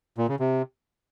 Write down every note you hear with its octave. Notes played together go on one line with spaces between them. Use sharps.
A#2
C#3
C3